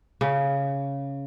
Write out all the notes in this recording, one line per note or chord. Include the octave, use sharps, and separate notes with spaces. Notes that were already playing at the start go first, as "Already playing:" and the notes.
C#3